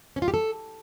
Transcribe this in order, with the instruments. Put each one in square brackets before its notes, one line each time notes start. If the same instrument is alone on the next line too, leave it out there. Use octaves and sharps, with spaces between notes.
[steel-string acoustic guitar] C#4
F4
G4
A4